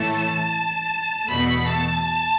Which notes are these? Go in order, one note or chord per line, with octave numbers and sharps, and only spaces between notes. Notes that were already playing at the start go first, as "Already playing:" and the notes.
Already playing: A2 E3 A3 A5
E2 B2 A3 B5
A5